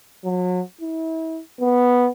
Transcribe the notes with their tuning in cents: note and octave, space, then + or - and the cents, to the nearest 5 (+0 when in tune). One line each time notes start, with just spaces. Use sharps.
F#3 -35
E4 -35
B3 -5